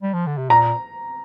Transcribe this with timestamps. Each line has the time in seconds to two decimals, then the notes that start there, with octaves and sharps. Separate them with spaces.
0.02 G3
0.14 F3
0.27 D3
0.37 C3
0.50 A#2 A#5